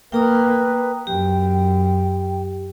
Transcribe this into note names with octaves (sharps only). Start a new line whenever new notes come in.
A#3 B4 G5 A#5 D#6
F#2 G4 G5